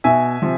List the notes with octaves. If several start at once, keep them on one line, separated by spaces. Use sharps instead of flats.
B2 E5 G#5
C3 F3